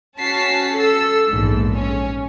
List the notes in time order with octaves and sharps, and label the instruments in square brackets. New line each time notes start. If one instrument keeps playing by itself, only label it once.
[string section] C#4 F#4 A5 B6 C7
A4 E6
A#1 E2 G#2
C#4